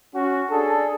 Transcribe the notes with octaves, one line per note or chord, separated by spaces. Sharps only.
C#4 F#4
D4 G#4 A4